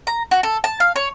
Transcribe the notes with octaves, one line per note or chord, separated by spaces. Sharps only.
A#5
F#4
A4
A5
F5
C#5